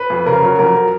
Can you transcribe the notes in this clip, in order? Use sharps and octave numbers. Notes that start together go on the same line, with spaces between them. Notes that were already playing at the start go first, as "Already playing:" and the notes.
Already playing: B4
F2
C#3 A#4
F#3
F2 A#4